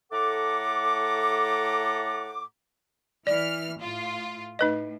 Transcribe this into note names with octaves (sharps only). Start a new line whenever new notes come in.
A2 A3 A4 F#5 A#5 D6
E3 D5 F6
A2 F4
A2 D#4 B4 D#5